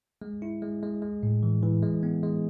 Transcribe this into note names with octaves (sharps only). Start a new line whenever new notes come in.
G#3
E4
G#3
G#3
G#3
A2
E3
E3
G#3
B3
G#3